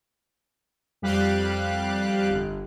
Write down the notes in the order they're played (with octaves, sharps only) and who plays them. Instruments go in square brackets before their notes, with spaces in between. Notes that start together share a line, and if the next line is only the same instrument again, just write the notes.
[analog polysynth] F2 G3 G4 F5 F#6
G1